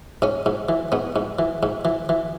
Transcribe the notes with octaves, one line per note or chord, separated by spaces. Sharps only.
G#2 C#4
G#2
E3
G#2 B3
G#2
E3
G#2
E3
E3